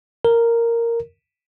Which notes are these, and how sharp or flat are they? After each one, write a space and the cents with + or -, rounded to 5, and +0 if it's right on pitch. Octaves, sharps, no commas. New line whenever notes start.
A#4 -5